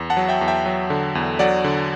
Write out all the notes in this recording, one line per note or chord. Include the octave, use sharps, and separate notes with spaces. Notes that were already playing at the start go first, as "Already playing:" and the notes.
Already playing: E2
F#5 A5
F#3
E5 G5
E2
E5 G5
F#3
D3
E2
F#3 D5 F#5
D3